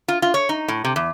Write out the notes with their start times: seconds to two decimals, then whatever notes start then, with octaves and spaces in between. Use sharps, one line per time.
0.08 F4
0.22 F4
0.34 C#5
0.49 D#4
0.68 A2
0.85 C3
0.96 E2